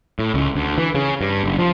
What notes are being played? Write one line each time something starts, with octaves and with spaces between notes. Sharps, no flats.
A2
C#2
D2
E3
C#3
G2
F#1
F3